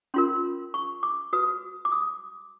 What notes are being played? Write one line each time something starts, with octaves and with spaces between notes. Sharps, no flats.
C#4 F4 A#4 C6
C#6
D6
F#4 B4 D#6
D6
D#6